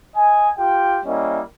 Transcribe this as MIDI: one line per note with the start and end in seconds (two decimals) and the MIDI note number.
0.16 0.49 75
0.16 0.49 80
0.57 0.99 65
0.57 0.99 67
0.57 0.99 79
1.05 1.40 55
1.05 1.40 58
1.05 1.40 61
1.05 1.40 64
1.05 1.40 75